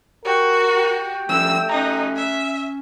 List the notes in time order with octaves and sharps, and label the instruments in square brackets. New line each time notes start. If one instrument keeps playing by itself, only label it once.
[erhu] F#4 [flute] G4 [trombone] A#4
[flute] G4
[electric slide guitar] F3 G3 C#4 [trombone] A3 [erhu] E6
[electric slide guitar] C#4 A#5 [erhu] D#4
[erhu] E5